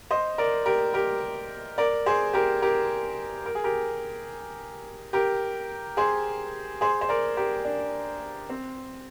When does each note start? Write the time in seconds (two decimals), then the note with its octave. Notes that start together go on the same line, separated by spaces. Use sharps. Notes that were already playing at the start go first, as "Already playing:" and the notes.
0.11 C5 D#5
0.38 A#4 D5
0.66 G4 A#4
0.94 G4 A#4
1.78 A#4 D5
2.06 G#4 C5
2.33 G4 A#4
2.62 G4 A#4
3.46 A#4
3.55 G#4
3.64 G4 A#4
5.13 G4 A#4
5.97 G#4 C5
6.81 G#4 C5
7.01 C5
7.09 A#4 D5
7.37 G4 A#4
7.65 D4
8.50 C4